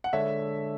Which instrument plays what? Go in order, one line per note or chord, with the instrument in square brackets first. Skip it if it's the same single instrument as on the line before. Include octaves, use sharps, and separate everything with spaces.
[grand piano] F#5
[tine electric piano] D3 G#3 D4 A4 C#5 [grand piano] E5